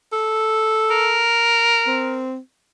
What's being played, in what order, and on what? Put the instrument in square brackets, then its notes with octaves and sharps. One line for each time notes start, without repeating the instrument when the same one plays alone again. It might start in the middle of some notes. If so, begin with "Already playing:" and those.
[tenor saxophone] A4
[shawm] A#4
[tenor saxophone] C4